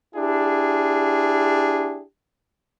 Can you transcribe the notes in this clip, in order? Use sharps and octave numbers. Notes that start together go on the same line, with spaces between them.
D4 E4 G4 G#4